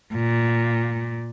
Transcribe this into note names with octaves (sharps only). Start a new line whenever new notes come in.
A#2